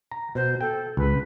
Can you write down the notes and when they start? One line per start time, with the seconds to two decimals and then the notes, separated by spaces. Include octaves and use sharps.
0.11 A#5
0.35 B2 C5
0.61 A4 G5
0.97 C#2 B4